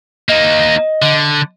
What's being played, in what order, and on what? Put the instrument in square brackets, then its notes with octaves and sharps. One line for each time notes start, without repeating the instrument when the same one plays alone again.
[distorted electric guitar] A#3 D#4 [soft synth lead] D#5
[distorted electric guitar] D3